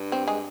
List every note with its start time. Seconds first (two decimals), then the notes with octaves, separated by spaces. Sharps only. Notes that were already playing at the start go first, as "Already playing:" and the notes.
Already playing: G2
0.12 C4
0.27 G#3 G#4